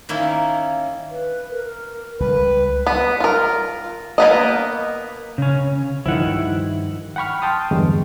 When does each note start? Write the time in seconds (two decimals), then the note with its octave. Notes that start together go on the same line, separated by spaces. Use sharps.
0.09 D#3 A#3 C#4 E4
1.10 B4
1.50 A#4
2.20 C#2 G3 B4
2.87 B3
3.20 F4 A#4
4.18 A#3 B3 D#5
5.38 C#3 C#4
6.06 G2 D#3 F3 E4 F#5
7.16 F#5 G5 B5 C#6 F6
7.42 G5 A5 C6 D#6 F6
7.71 E2 G2 D3 E3 F#3 G#3